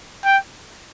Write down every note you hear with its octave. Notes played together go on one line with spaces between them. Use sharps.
G5